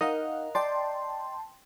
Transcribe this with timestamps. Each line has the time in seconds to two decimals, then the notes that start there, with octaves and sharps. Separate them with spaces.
0.01 D#4 A#4 D#5 F5 F#5 A#5
0.55 D5 G5 A5 C6